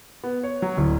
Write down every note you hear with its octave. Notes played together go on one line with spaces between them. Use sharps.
B3
C#5
F#3
D1